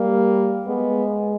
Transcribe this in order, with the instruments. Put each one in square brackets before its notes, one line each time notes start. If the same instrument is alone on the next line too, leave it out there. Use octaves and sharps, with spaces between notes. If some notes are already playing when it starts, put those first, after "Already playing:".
Already playing: [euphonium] G3 [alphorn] A#3
[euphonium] G#3 [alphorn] B3